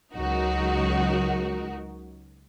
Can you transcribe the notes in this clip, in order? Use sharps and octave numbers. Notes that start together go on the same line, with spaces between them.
C#2 F#3 D#4 F#4 A#4